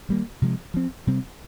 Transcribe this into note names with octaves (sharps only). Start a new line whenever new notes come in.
D#3 G3 A#3
C3 F3 G#3
F3 C4
C3 G3 C4